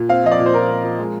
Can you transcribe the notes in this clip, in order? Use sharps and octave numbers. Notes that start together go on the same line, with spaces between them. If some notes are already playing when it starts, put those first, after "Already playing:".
Already playing: A#2
C4 F5
F3 D#5
D5
A#2
C5
A#2 A#4
C4
F3
G#3